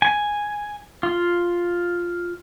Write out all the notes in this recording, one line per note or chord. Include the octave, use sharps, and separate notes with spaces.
G#5
F4